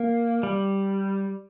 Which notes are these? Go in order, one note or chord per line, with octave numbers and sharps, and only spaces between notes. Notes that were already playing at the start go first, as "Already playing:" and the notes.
Already playing: A#3
G3